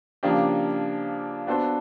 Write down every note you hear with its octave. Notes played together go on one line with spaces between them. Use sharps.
C#3 F3 A#3 D4 G4
B3 D4 F#4 A4 C5